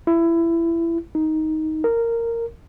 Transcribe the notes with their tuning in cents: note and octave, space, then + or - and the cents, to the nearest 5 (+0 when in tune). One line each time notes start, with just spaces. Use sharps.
E4 +20
D#4 +10
A#4 -10